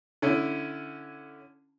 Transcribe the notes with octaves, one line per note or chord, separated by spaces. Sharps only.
D3 C#4 E4